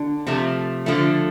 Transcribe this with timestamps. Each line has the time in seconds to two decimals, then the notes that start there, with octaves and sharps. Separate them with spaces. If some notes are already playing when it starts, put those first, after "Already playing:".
Already playing: D3
0.27 C3 F3 A3
0.86 D3 F3 A3